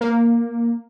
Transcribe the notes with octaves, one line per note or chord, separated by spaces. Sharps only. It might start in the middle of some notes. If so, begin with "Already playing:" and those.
A#3